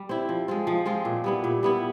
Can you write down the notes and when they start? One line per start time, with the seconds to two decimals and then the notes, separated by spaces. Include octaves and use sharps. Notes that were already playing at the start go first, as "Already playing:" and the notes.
Already playing: G3
0.09 C4 E4
0.29 F3
0.48 G#3 C4 F4
0.67 F3
0.86 G#3 C4 F4
1.05 A#2
1.24 G3 B3 E4
1.44 A#2
1.63 G3 B3 E4